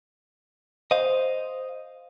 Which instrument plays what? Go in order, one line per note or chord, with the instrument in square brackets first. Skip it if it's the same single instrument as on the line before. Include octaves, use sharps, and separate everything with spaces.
[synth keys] C5 [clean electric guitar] D#5 F5